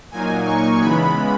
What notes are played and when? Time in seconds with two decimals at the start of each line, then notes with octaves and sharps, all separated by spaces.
0.11 A#2 F#3 A#3 D#4 G#5
0.46 C#6
0.80 C#3 E3 G#3 B3 B5